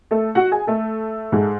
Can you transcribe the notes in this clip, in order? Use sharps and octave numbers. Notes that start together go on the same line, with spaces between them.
A3 A4
F#4 F#5
G#4 G#5
A3 A4
G#2 G#3